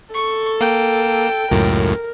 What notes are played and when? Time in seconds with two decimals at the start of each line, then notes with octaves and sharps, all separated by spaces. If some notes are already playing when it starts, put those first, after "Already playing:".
0.14 A4 C#6
0.61 A#3 G5
1.52 C#2 F#2 A2 A#4